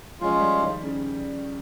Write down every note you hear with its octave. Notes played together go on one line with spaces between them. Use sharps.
F3 G#3 C#4 F4
G3
D#3
C#3